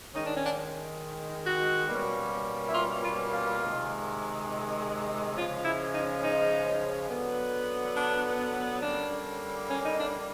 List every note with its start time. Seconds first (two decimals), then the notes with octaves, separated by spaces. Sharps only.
0.14 D#3 G#3 C#4 D#4
0.25 D4
0.35 C#4
0.46 D4
1.45 F#4
1.88 B2 G3 A#3 C#4
2.64 E4
2.74 F4
3.04 F4
3.32 F4
3.62 C3 D#3 G#3
5.34 C#3 F3 G#3 C#4 F4
5.63 E4
5.93 D#4
6.22 D#4
7.08 D3 F#3 B3
7.95 D4
8.81 D3 G3 A#3 C#4 D4
9.69 C#4
9.85 D#4
9.97 D4